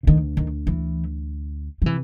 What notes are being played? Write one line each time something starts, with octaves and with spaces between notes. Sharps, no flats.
C#3
D2 D3 D#3
D#3
E3
F3
C3 E3